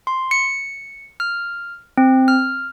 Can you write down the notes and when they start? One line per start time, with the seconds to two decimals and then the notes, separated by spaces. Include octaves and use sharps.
0.07 C6
0.31 C#7
1.20 F6
1.97 C4
2.28 F6